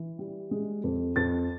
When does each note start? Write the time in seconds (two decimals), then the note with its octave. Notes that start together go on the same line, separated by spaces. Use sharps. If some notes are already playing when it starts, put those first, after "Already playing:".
Already playing: E3
0.19 G3
0.51 G#3
0.84 F2
1.16 F2 A6